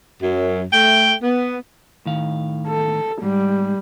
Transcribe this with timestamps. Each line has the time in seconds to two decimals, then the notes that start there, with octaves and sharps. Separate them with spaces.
0.21 F#2
0.73 A3 G5
1.23 B3
2.06 A2 D#3 F5
2.68 A4
3.22 G#2 G3